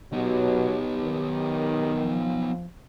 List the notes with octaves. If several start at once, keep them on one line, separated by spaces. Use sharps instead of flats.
B2 F#3 B3 D#4 G4
D#3
F3